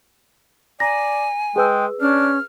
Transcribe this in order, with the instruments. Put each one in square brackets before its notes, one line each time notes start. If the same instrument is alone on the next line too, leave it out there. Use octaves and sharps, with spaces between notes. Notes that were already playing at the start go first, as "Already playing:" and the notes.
[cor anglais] D5 [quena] G#5 [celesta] A#5 A#6
[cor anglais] G#3 [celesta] G#4 B4 E6 [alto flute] G5
[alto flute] C#4 [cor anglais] D4 [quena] F6